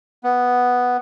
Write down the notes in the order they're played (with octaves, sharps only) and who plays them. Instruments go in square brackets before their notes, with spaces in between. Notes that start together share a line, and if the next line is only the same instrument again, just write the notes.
[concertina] B3